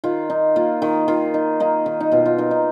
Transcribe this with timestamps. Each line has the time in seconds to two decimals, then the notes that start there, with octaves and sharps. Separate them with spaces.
0.04 D#3 F4
0.30 D#4
0.56 A#3 F4
0.82 D#3
1.08 D#3 F4
1.34 D#4
1.60 A#3 D#4
1.86 D#3
2.00 D#4
2.12 B2 F4
2.26 F4
2.38 D#4 A#4
2.51 D#4